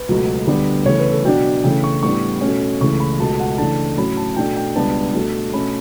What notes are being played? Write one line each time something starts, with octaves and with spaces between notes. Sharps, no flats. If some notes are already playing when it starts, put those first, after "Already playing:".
Already playing: B4
C#2 B2 F#3 A3
D2 D3 G3 B3 D4
C#3 E3 A3 C#5
B4
A4
B2 F#3 B3 D4 G5
C#3 E3 A3 C#4 G5
C#6
A2 G3 B3 D4 C#6
B2 A3 C#4
C#2 C#3 E3 A3 C#6
B5
C#2 B2 A3 A5
F#5
C#3 E3 A3 D4 A5
A2 F#3 C#4 B5
A5
B2 A3 D4 G5
G5
C#2 B2 G3 B3 D4 A5
B2 A3 D4
B2 A3 C#4 B5